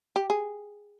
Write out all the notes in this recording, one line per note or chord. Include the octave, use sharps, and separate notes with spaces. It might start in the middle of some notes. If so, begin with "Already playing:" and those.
G4
G#4